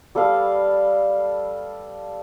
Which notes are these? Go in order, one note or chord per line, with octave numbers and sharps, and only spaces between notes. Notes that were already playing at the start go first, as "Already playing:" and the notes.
G3 A4 B4 F5